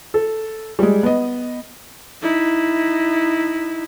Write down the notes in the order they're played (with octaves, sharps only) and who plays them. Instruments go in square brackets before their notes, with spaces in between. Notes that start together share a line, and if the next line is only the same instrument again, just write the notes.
[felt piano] A4
G3 G#3
B3 D#5
[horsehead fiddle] D#4 E4